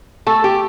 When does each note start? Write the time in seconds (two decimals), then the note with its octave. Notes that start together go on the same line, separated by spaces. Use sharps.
0.27 A3 A4
0.44 G4